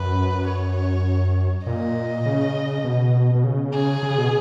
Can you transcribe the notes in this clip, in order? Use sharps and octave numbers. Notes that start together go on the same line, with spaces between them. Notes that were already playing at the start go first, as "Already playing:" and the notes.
Already playing: F#2 B4
C#5
A#2 D#5
C#3
B2
B2
C#3
G#4
C#3
B2